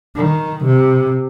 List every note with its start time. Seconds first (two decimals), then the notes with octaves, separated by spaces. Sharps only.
0.16 D#3
0.64 C3